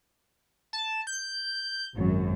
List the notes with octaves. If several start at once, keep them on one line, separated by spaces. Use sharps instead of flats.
A5
G6
G#1 F#2